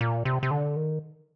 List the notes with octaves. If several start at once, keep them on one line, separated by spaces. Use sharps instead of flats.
A#2
C3
C3
D3
D#3